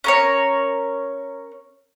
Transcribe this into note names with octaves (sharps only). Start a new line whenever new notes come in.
C#4 A#4 C#5